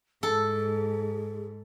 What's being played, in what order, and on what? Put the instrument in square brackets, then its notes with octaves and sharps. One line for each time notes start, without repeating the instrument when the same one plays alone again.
[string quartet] G#2 [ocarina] G#4 [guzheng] A4